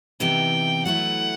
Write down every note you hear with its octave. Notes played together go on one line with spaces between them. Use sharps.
C3 E3 B3 D#4 G5
F#3 A3 E4 B4 F#5